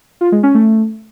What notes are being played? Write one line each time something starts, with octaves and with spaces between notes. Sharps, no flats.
F4
G#3
C#4
A3